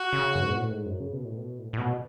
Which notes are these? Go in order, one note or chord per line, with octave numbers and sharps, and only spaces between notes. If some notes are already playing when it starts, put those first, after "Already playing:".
Already playing: F#4
C#3
F#2
G#2
B2
A2
G#2
F#2
C#3
B2
A2
B2
A2
A2
B2